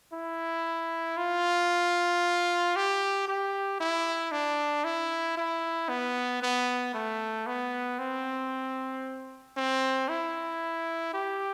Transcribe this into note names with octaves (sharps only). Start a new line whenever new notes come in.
E4
F4
G4
G4
E4
D4
E4
E4
B3
B3
A3
B3
C4
C4
E4
G4